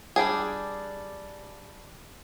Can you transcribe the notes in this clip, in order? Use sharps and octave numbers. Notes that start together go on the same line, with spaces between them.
G3 D4 G#4